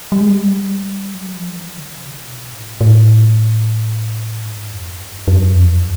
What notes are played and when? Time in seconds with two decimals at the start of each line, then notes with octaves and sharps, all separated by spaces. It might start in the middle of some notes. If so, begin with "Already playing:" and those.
0.12 G3
0.21 G#3
0.30 G3
1.15 F#3
1.36 F3
1.57 E3
1.77 D3
1.97 C3
2.25 B2
2.53 A2
2.81 A2
4.45 G#2
4.72 F2
5.00 G2
5.28 F#2
5.55 F2